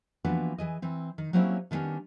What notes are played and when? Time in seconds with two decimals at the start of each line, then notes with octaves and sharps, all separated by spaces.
0.25 E3 F3 A#3 B3 D4 F#4
0.58 E3 G#4 D#5
0.82 E3 C4
1.18 D#3
1.33 F#3 G3 A#3 C4 C#4 E4
1.71 D3 D#3 G3 B3 C#4 D4